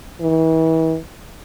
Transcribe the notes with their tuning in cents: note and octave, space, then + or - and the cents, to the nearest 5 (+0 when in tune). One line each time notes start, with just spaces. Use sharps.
E3 -35